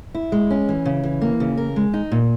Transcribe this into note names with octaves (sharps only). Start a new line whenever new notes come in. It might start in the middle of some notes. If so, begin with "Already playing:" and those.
E4
G#3
C#4
E3
C#3
E3
A#3
C#3
A#4
G#3
D#4
A#2